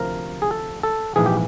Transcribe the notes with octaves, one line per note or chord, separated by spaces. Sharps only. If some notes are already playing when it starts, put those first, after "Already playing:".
Already playing: D2 C3 F3 A#4
G#4
A4
A4
A#1 G#2 E3 G#4
G4